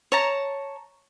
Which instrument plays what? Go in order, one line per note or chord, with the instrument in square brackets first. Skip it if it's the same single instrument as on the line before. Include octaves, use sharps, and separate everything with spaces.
[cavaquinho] C#5 A5 A#5